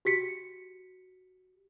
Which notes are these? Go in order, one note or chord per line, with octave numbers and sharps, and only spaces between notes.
F#4 G4 B6 C#7